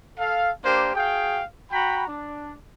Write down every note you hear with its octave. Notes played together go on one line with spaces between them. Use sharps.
A4 F5
A#3 D4 G4 A#4 C5
F#4 G#4 F5 G5
F#4 G5 A#5 B5
D4